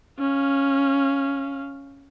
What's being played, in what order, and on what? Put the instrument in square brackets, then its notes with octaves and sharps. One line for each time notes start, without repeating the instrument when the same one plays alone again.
[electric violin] C#4 F5